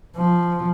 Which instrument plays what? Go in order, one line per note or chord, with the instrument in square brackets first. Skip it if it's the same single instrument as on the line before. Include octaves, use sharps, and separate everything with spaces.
[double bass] F3